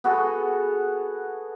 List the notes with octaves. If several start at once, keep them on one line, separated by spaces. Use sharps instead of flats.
B3 F#4 G#4 A4